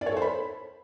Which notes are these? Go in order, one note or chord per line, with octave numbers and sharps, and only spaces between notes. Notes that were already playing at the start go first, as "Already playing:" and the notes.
D5
C#5
A4
C5
B5